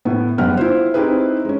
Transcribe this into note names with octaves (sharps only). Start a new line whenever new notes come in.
A2 B3
F#1 G3 B3 G4 F#5 F6
E4 F4 C5
C4 D#4 E4 G4 G#4 B4
G#3 C#4